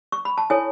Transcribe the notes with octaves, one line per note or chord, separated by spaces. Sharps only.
C#6
B5
A5
E4 A4 C#5 G#5